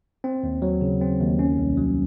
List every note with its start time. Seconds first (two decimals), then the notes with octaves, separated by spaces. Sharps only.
0.24 C4
0.43 D#2
0.62 F#3
0.81 C#3
1.01 C4
1.20 D#2
1.39 C#4
1.58 C2
1.77 F#3